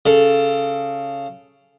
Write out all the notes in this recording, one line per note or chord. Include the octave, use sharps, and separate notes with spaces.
C#3 A4